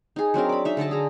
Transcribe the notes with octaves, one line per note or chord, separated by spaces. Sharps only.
D#4 G#4
F#3 C4 D4 A#4
B5 D6
D#4 E5
D3 A4 D#5 A5
G#4 A#5